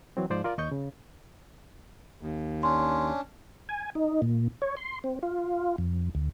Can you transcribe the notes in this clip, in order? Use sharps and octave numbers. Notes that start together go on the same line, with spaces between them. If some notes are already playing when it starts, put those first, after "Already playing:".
E3 F#3 C4
G#2 F3 C5 D5
F4 A#4 D5
D#2 D#5 C#6 G6
C#3
D#2
C#4 D4 C6
G#5
D#4
A#2
C#5
C6
C4
F4
F2
D2